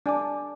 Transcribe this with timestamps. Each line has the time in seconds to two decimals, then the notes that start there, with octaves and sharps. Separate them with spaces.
0.06 D4 D5 G#5 D6